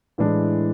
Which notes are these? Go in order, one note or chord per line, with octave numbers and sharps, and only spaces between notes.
A2 E3 G#3 D4